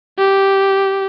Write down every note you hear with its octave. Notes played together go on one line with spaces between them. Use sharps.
G4